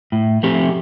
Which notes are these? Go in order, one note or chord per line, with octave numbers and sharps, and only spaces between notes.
A2
F3 A3 C4 G4